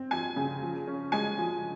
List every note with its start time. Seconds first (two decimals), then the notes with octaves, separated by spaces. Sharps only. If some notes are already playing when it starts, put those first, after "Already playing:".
Already playing: C4
0.11 F3 G#5
0.36 C#3
0.62 F3
0.87 C#4
1.12 G#3 G#5
1.38 F3